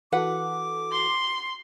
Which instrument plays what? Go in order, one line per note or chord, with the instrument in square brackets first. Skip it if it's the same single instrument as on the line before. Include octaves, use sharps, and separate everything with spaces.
[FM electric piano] E3 F#4 A4 [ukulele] B4 F#5 [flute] D6
[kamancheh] C6